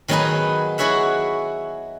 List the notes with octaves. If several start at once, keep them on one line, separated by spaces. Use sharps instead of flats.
D#3 F#3 B3 D#4 G#4 B4
E4 F#4 G#4 C#5 E5 F#5